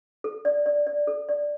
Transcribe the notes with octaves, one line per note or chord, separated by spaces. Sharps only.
A4
D5
D5
D5
A4
D5